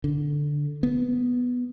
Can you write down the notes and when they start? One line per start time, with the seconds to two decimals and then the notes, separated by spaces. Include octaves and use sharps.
0.04 D3
0.83 B3